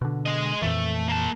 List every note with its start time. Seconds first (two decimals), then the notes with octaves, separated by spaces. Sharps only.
0.01 B2 D3
0.26 G#3 D#5
0.62 F2 A#2 E3 A3
1.08 A#3 A5